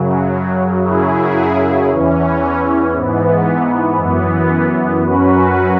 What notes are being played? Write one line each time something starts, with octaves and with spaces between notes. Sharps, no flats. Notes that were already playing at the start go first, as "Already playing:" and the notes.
Already playing: F#2 C#3 F#3
F#2 C#3 F#3 E4 G#4
E2 E3 C#4
G#2 E3 B3
F#2 E3 B3
F#2 F#3 C#4 F#4 B4